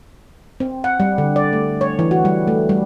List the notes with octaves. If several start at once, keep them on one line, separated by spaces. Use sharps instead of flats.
C4
F#5
G3
D3
D5
A3
C#5
E3
F#4
G3
A3
G3